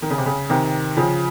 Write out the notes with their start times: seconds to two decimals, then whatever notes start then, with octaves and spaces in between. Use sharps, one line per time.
0.02 D#3
0.10 C#3
0.18 C3
0.26 C#3
0.50 C3 D#3
0.97 C#3 F3